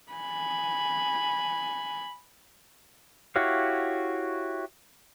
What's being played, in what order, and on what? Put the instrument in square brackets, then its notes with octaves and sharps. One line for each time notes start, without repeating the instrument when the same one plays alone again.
[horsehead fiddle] G#5 B5
[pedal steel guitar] E4 F#4 G4 C#5 F5